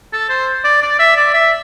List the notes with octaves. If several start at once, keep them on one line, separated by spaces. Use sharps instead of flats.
A4
C5
D5
D5
E5
D5
E5